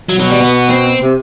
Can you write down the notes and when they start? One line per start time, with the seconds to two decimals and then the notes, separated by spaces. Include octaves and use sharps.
0.09 B2 F#3
0.20 F#3
0.30 G3
0.40 B3
0.70 C4
1.01 C3